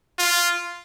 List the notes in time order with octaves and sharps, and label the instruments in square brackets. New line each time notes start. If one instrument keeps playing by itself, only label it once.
[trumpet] F4